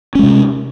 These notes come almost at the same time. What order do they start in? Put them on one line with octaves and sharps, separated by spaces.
C#4 G#3 C3